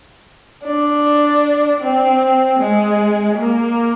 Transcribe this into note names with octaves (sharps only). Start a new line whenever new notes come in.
D4
C4
G#3
A#3